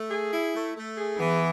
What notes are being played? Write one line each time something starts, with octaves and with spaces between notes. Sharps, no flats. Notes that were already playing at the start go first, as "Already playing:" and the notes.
Already playing: A3
G#4
E4
A3
A3
G#4
E3 B3